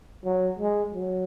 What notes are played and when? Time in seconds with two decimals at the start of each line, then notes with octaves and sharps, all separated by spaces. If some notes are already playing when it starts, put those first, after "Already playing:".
0.24 F#3
0.59 G#3
0.94 F#3